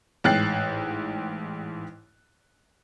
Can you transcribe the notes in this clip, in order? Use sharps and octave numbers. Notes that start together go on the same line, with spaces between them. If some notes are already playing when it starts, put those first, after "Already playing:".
A1 G#2 G5 F#6 A6 C7